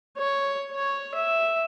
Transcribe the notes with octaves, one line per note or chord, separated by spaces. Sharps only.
C#5
C#5
E5